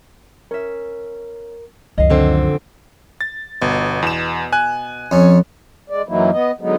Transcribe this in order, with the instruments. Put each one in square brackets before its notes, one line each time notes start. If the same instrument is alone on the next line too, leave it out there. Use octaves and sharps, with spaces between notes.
[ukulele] C#4 E5 [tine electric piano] A#4
[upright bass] C#2 [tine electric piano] F#2 D#3 F#3 [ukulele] D#5 F5
[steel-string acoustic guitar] F2 D3 C4
[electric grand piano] A6
[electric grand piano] G1 [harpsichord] B2
[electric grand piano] E2 E7
G#5 F#6
[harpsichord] F2 C#4
[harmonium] G#3 D5
F#2 E3 F#3 A#3 D#4 E4
B3 D#5
D3 F#3 G#3 B3 D#4